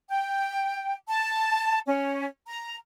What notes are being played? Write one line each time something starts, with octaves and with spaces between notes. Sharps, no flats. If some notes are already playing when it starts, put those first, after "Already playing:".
G5
A5
C#4
A#5